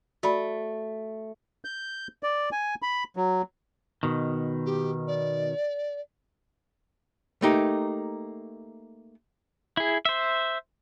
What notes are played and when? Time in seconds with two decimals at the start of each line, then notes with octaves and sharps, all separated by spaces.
0.23 A3 F#4 D5 B5
1.65 G6
2.23 D5
2.52 G#5
2.82 B5
3.16 F#3
4.03 B2 D#3
4.65 G4
5.07 D5
7.42 A3 A#3 D#4 G4
9.77 E4 G#4
10.05 C5 E5